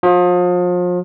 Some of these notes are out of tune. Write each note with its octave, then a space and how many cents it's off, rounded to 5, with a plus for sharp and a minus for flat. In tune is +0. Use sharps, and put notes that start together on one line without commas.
F3 +35